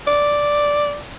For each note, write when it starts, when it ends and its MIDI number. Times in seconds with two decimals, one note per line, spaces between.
0.07 0.99 74